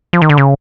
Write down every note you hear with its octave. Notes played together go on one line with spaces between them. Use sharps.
F3
D#3
D3
C#3